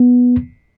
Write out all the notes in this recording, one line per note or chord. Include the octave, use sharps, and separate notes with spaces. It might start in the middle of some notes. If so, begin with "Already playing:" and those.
Already playing: B3